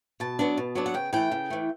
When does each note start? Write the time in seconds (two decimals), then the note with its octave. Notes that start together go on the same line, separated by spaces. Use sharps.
0.20 B2 A5
0.39 F#3 B3 D4
0.58 B2
0.75 F#3 B3 D4
0.86 F#5
0.94 C#3 G5
1.13 E3 A3 G5
1.31 C#3
1.50 E3 A3